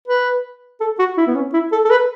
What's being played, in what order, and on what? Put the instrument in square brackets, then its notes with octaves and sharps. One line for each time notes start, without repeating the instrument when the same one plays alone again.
[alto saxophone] B4
A4
F#4
E4
B3
C#4
E4
A4
A4
B4